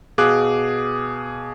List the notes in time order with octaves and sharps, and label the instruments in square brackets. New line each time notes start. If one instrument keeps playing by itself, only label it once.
[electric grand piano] B2 G#4 F5 D6 F#6